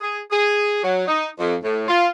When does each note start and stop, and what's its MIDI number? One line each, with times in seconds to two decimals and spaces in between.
0.01 0.19 68
0.30 0.82 68
0.84 1.04 54
1.08 1.27 63
1.39 1.55 41
1.63 1.88 45
1.89 2.07 65